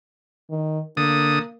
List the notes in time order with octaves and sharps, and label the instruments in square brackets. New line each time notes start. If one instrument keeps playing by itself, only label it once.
[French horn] D#3
[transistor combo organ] D3 D#6 [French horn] A#3